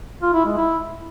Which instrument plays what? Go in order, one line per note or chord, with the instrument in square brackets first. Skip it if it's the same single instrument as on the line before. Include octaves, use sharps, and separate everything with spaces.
[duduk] F4
E4
G#3
E4